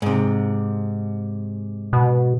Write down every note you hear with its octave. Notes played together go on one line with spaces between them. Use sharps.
G#2 C3
B2